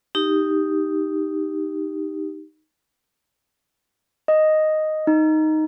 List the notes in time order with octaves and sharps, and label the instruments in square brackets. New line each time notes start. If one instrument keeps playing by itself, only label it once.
[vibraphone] D#4 G4
[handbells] D#5
D#4